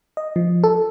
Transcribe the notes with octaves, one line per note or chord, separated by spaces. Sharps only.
D#5
F3
A4